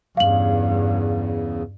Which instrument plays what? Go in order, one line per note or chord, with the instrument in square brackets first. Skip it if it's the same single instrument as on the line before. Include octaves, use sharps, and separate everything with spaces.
[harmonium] E2 C#3 [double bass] G2 [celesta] F5 F#7